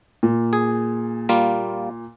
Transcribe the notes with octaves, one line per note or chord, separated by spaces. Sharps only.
A#2
G#4
G3 A#3 F4